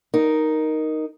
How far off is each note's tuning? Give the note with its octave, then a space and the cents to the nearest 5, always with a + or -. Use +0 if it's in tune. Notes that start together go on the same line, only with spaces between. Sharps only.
D#4 +0 A#4 +0